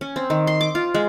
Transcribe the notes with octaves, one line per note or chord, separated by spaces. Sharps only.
C#4
C4
D#3
C6
D6
F4
G#3